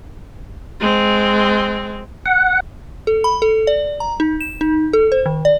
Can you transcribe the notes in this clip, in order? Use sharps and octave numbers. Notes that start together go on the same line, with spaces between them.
G#3 C4
F#5
A4
B5
A4
D5
A#5
D#4
E7
D#4
A4
C5
D#3
D5